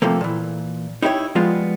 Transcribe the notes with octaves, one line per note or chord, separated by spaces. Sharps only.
C3 F3 A3 A#3
A#2 E3
D#4 E4 G4 B4 C#5
F3 G3 G#3 B3 F4